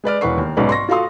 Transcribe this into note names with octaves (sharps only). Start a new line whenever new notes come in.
G#3 B4 D5 F6
E1 E3 B4 F#5 C#6 C7
D#2
B1 G#2 C#4 B4 D5
C6 C#6 A#6
F4 F#4 A4 F5 C6 D#6